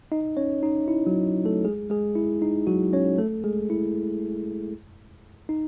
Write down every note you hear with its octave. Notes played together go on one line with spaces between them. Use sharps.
D#4 D#5
C#4 C#5
D#4
E4
F#3 F#4
A3 A4
G#3 G#4
G#3 G#4
E4
D#4
F#3 F#4
C#4 C#5
A3 A4
G#3 G#4
E4
D#4